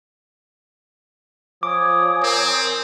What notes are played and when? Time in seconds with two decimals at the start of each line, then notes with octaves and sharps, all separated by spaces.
1.63 F3 C#5 G#5 D6 D#6
2.23 C4 A#4